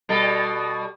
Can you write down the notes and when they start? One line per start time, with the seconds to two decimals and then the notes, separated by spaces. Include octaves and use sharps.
0.09 B2 G3 A4